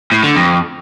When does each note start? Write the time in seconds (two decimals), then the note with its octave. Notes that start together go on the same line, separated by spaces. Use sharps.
0.12 A2
0.24 D3
0.36 F2